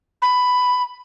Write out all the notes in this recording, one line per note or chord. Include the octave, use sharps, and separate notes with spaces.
B5